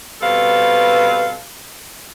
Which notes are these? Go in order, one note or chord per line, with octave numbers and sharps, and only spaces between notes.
B2 G3 C4 A4 B4 F5